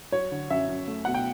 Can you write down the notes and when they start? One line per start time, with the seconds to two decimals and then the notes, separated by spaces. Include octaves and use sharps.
0.12 F#3 C#5
0.31 D3
0.50 F#2 E5
0.68 F#2
0.88 A3
1.05 B2 F#5
1.14 G5